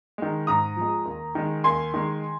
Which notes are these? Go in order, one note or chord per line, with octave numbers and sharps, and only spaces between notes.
D#3 G#3
G#2 A#5 D#6
F3
G#3
D#2
D#3 G#3
D#2 G#5 C6
D#3 G#3